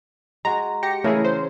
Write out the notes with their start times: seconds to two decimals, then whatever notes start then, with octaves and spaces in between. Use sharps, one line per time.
0.45 G#3 F#4 A#5
0.83 G4 A#6 C#7
1.04 C#3 E3 A3 E4 G#4 A#4
1.25 C5